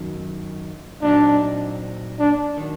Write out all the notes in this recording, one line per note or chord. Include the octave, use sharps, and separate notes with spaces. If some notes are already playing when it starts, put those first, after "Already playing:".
Already playing: F#2 D#3 F#3
A#2 F#3 C4 D4 D#4
D4
D#3 F#3